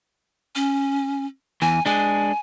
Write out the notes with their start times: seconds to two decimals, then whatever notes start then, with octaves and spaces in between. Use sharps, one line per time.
0.55 C#4
1.62 E2 E3 G#5
1.86 G#3 D4 G#5